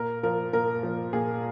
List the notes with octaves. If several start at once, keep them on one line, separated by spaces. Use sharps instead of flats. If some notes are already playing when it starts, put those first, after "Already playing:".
Already playing: A#2 A#4
F3 A#4
A#2 A#4
F3
A#2 G#4